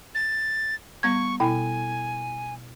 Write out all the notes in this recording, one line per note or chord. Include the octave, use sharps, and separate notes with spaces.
A6
G3 B3 C#6 G#6
B2 E4 G5 G#5